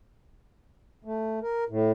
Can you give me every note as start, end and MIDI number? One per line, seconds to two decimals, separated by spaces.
1.05 1.39 57
1.43 1.64 70
1.69 1.92 45